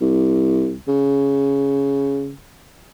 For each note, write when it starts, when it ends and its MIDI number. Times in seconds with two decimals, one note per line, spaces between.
0.01 0.74 36
0.88 2.33 49